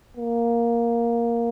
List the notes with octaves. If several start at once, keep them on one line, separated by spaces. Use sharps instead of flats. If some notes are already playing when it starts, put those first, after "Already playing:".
A#3